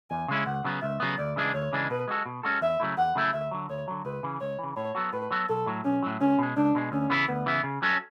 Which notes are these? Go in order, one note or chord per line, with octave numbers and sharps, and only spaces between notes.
E2 G#5
C#3 G#3 C#4 E4
C#2 F#5
C#3 F#3 B3
C#2 E5
C#3 F#3 B3
D2 D5
C#3 E3 G#3 D4
D2 C#5
C#3 E3 G#3 D4
B2 B4
G#3 C#4 F#4 A4
B2
G#3 C#4 F#4 A4
E2 E5
C#3 F#3 A3 E4
E2 F#5
C#3 F#3 A3 E4
D2 E5
D3 F#3
D2 C#5
D3 F#3
C#2 B4
C#3 E3
C#2 C#5
C#3 E3
A2 C#5
F#3 B3 F#4 A4
A2 B4
F#3 B3 F#4 A4
B1 A4
A2 F#3
B1 C#4
A2 F#3
C#2 C#4
B2 G#3
C#2 D4
B2 G#3
D2 C#4
C#3 E3 B3 E4
D2 B3
C#3 E3 B3 E4
C#3
F#3 C#4 F#4 A4